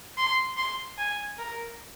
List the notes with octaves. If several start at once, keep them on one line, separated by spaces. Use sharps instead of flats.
C6
C6
G#5
A#4